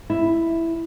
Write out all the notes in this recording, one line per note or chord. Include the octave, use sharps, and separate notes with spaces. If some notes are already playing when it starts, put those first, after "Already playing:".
E4